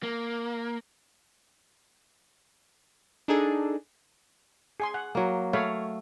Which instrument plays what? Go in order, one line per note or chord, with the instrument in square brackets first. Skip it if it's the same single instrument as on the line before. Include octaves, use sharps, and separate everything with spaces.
[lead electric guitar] A#3
[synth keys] D4 D#4 G#4 A4
[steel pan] G#4 G#5 C6
F#5
[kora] F#3 A#3
[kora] A3 [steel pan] C#5 F5 B5